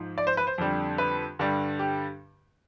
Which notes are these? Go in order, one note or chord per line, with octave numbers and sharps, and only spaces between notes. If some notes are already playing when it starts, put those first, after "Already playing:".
Already playing: G#2 F3
D5
C5
B4
C5
F2 D3 G3
B4
G2 D3 G3
G4